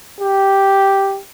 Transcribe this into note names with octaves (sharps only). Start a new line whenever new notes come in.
G4